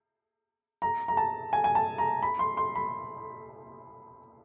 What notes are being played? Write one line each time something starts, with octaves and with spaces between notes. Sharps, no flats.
A#5
A#5
A5
G#5
G#5
A5
A#5
B5
C6
C6
B5